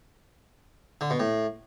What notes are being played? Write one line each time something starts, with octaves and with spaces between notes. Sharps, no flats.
D3
B2
A2